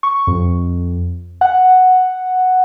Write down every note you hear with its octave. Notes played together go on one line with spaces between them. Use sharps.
C#6
F2
F#5